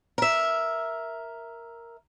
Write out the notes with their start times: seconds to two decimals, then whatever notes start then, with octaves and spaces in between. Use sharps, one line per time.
0.18 A#4 E5